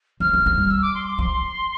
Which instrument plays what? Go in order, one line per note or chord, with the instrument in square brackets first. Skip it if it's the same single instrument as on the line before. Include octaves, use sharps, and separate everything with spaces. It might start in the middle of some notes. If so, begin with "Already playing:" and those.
[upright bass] F3 [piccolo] F6
[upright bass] E3
F3
G3
[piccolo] E6
D6
C6
D6
[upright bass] F3 [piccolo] C6